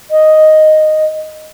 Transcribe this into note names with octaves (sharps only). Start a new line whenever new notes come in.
D#5